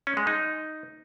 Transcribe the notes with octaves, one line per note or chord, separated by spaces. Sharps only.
C#4
G#3
D#4